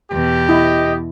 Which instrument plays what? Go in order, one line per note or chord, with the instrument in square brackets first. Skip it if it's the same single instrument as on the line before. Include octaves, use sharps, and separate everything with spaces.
[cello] E2 B2 [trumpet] G4
[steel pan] E4 [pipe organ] D#5